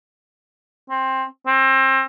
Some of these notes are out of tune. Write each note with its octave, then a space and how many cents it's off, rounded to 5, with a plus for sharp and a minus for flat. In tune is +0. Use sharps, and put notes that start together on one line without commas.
C4 +15
C4 +30